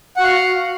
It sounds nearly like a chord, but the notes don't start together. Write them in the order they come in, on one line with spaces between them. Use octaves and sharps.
F#5 F#4 F5